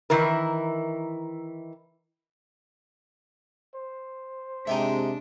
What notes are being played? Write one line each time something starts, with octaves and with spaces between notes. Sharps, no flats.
D#3 E3 E4 A#4
C5
C3 G#3 D4 D#4 G4 E5